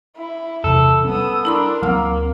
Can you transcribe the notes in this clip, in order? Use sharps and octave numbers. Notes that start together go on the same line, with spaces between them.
E4
E2 C3 A4
G3 A3 B3 C#4 D#6
D4 E4 A#4 B5 C6
D2 F#3 A#3 C4 E6 F6